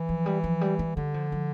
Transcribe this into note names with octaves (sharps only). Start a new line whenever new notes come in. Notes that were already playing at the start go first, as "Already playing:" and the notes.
Already playing: E3
F3
G3
F3
G3
G3
D3 G3
F3
F3